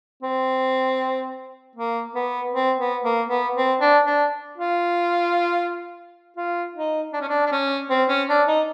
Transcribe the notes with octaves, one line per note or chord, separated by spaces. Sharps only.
C4
A#3
B3
C4
B3
A#3
B3
C4
D4
D4
F4
F4
D#4
D4
C#4
D4
D4
C#4
C4
C#4
D4
D#4